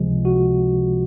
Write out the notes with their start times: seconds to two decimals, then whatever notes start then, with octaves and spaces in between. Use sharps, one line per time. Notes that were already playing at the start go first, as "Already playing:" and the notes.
Already playing: C#2 C3 F3 G#3
0.25 F#4